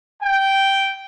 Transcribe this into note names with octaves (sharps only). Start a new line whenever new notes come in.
G5